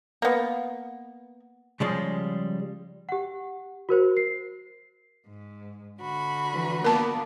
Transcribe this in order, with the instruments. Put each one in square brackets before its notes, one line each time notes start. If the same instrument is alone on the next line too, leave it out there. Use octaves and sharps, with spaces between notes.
[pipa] A#3 B3
[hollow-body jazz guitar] C#3 F3 G3 G#3
[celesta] G4 F#5
F#4 A#4 C5
C7
[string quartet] G#2
D3 F#4 B5
[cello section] E3 B4
[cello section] A#3 B3 D5 [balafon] A#4 A5